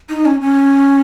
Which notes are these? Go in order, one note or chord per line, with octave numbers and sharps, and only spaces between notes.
D#4
C#4
C#4